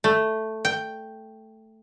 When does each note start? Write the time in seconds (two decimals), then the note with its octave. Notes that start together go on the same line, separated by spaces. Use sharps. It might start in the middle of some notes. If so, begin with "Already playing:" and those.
0.04 A3
0.65 G5